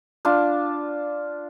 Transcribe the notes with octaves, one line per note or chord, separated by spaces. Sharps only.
D4 F4 A5